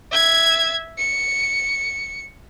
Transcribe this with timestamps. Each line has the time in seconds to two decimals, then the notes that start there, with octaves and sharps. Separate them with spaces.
0.11 E5 G#6
0.98 C#7